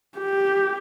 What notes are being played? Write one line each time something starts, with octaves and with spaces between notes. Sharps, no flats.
G4